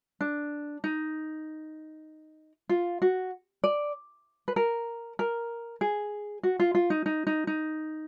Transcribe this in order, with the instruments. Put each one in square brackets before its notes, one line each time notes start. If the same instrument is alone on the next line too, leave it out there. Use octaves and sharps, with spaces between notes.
[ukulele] D4
D#4
F4
F#4
D5
B4
A#4
A#4
G#4
F#4
F4
F4
D#4
D#4
D#4
D#4